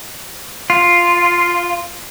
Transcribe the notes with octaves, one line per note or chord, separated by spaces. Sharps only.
F4